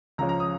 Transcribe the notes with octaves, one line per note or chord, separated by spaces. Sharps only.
C#2 C#3 F3 C#4 A#5
A#5
D#6